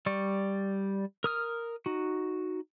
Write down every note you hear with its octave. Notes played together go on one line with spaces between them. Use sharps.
G3 D5 C#6
A#4 D#6 F6
D#4 F#4